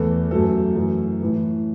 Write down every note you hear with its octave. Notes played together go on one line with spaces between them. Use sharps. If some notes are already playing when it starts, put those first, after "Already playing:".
Already playing: E2 E3 A3 A4
F#2 F#3 A3 A4
F#2 E3 A3
A2 E3 A3